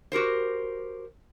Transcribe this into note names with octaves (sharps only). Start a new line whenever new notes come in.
F#4 G4 A#4 C5